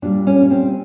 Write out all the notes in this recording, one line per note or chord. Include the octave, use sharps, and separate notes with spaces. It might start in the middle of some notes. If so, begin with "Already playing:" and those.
A#2 G3 D4
C#4
C4